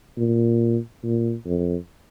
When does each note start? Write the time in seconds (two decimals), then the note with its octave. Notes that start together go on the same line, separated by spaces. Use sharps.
0.17 A#2
1.04 A#2
1.46 F2